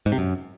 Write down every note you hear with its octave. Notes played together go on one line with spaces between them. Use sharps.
G#2
C3
F#2